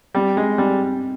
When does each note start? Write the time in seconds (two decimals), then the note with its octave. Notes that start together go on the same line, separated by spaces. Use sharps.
0.15 G3 C4
0.37 G#3
0.58 G3 C4